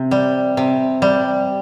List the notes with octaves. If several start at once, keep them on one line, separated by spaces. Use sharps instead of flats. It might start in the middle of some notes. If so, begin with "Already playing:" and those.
Already playing: C3
G3
C3
G3